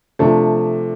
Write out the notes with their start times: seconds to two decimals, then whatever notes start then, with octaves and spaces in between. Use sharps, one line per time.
0.19 C3 F3 A3 D4